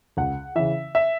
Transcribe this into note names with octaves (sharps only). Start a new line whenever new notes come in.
C#2 F#5
C#3 E3 E5
E5